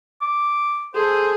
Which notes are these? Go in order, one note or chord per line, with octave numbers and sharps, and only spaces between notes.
D6
G#4 A4 C5